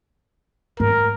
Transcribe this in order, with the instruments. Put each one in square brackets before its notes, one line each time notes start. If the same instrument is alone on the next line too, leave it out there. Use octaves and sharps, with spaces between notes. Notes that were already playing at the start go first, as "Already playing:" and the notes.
[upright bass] G#2 [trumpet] A#4